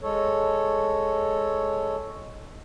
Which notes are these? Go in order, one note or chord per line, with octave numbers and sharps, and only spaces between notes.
G#3 A4 C#5